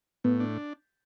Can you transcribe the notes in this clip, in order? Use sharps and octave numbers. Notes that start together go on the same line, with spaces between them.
A2 B3
D4